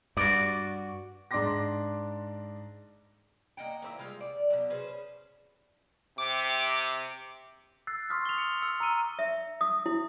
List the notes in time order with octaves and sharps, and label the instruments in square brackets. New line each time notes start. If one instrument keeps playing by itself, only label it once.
[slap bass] G2 [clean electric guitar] F#4 D5
[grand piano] G#2 D4 D5 C6 D6 A#6
[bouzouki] A#3 D#5 F#5 G5
A#3 C4 E4
G3 G#3 F4
D5
B2 F#3
C#4 G#4 B4 C5
[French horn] C3 [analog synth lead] D6
[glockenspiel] E6 F#6 A6 C7
C6 C#6 D#6 F6 B6 C7
F7 G7
C#7
E6 F6 C#7
A#5 E6 C#7 D#7 G7
[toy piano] E5
D#6
E4